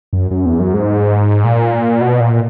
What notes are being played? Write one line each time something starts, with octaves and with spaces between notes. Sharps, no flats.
F#2
F#2
E2
F#2
G#2
A#2
B2
A#2